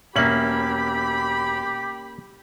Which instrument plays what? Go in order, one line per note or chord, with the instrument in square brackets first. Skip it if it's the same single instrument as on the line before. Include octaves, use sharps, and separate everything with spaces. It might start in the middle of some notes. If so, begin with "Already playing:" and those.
[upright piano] E1 E5 F#7 [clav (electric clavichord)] A#3 C#4 [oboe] G4 [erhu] B5